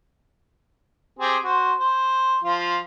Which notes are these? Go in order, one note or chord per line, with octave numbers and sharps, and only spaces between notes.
C4 G4 G#4
F#4 C5
C5
F3 F4